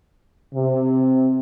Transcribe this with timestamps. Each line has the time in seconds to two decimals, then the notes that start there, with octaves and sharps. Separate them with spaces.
0.54 C3